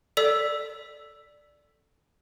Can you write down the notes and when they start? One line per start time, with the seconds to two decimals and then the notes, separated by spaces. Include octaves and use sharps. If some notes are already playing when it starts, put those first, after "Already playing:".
0.17 A4 D5 E6 B6